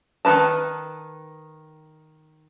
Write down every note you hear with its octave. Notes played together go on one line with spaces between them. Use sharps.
D#3 D#4 B4 A5